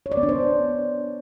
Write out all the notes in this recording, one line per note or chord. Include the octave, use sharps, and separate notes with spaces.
C#5
D5
B3
D4
C5